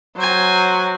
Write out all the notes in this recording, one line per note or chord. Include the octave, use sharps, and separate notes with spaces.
F#3 C5 G#5